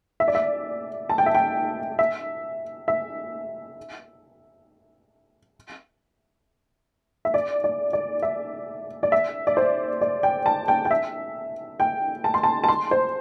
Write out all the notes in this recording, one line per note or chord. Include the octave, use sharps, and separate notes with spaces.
E5
D5
E5
A5
G5
E5
G5
E5
E5
E5
D5
D5
D5
E5
D5
E5
D5
C5
D5
G5
A5
G5
G5
E5
G5
A5
C6
A5
A5
C6
C5